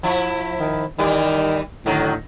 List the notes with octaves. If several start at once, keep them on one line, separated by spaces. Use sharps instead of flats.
F3 E4
D#3
D#3 E3 G3 D5
A2 D3 D#3 F#3